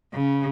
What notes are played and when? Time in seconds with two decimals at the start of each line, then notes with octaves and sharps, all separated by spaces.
0.14 C#3